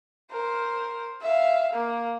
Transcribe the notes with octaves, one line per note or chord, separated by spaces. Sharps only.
A#4 C5
E5 F5
A#3